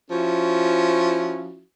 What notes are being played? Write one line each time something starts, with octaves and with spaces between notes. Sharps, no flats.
F3 C#4 E4 F#4